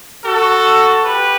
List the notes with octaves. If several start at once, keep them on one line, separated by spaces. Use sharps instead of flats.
F#4 A4
G4 B4